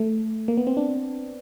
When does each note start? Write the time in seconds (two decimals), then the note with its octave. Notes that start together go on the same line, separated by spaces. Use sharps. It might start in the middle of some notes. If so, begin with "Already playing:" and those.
Already playing: A3
0.48 A#3
0.58 B3
0.67 C4
0.77 D4